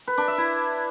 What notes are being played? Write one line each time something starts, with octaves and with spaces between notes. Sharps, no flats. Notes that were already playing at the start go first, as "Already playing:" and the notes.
B4
D4
E5
E4